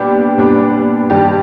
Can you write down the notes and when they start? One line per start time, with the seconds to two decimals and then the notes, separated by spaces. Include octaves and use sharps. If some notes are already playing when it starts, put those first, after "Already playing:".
Already playing: A#2 G3 B3 D4 G4
0.37 A#2 G3 B3 D4
1.10 G2 D#3 G3 G4